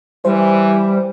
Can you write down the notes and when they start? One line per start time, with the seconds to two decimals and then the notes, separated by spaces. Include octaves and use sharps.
0.25 E3 G3 C5